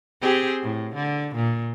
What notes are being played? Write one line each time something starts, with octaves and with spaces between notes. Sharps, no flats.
C4 G4 G#4
A2
D3
A#2